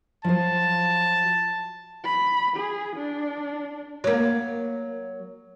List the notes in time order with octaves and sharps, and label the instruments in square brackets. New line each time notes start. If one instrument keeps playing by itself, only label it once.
[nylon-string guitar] F3 F#3 C5 [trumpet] A5
[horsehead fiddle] B5
G#4
D4
[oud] F#3 A#3